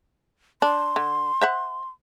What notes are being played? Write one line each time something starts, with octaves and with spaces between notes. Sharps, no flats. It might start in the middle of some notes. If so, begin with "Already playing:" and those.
D4 C6
D3
C5 E5 F#5